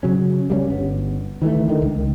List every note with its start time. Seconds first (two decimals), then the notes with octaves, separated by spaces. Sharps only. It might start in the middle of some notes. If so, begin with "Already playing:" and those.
0.03 C#3 F#3 C#4
0.50 G3 A3 C#4
0.70 G1 B3
1.42 D#3 E3 G#3 A3
1.68 D3 D#3
1.82 C#2